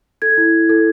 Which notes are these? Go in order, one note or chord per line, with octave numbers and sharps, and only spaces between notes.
A4 G#6
E4
E4
A4